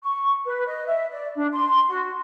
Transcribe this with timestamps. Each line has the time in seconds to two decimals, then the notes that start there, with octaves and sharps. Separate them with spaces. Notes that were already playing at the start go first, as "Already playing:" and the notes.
0.03 C#6
0.46 B4
0.67 D#5
0.87 E5
1.11 D5
1.36 D4
1.52 C6
1.89 F#4